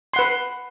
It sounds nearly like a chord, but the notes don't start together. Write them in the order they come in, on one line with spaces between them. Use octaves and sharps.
C6 F#5 B4